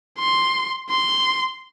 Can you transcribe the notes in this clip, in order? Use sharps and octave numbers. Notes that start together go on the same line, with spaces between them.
C6
C6